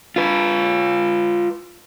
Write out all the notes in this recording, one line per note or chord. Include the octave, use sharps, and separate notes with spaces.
F4 B4